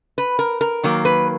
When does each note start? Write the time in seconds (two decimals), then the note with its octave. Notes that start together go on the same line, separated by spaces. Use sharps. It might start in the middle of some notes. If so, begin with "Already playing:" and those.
0.18 B4
0.39 A#4
0.61 A#4
0.83 D#3 F#3 A#3
1.05 B4